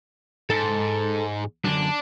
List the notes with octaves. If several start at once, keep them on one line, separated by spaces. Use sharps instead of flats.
G#2 A4 A5
F#2 D3 D4